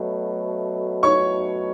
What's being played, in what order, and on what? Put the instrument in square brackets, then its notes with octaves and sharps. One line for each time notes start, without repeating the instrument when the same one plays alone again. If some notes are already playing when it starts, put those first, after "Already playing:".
Already playing: [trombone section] B2 F#3 A3
[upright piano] C#5 C#6